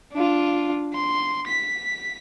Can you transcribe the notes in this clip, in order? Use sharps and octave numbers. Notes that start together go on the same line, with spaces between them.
D4 F4
C6
B6